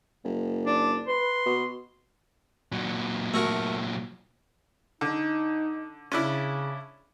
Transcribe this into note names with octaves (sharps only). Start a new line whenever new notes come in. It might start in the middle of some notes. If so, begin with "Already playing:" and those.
F#1
D4
B4 C6
B2
A#2 F#3
A3 F#4 A#4
D3 D#4
C#3 C#4 D4 E4